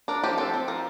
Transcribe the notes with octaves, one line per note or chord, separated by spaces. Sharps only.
D4 A#4
F3 G4
C4 A4
C4
F3 A#4